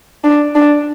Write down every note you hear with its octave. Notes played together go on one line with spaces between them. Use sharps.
D4
D4